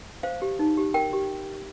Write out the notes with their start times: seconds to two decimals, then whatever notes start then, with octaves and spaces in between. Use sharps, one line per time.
0.23 C5 F5
0.42 G4
0.59 D#4
0.78 G4
0.94 A#4 G5
1.13 G4